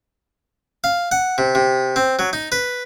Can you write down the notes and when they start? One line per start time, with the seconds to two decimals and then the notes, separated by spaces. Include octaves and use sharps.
0.84 F5
1.11 F#5
1.38 C3
1.55 C3
1.96 C4
2.19 F#3
2.33 D#4
2.52 B4